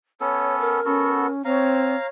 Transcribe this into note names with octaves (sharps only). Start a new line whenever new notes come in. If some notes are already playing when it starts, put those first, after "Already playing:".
B3 C#4 A4 C#5
A#4
B3 C#4 F#4 A4
C4 C#5 F5 A#5